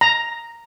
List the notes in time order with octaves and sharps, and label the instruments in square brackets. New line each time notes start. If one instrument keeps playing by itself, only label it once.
[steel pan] A#5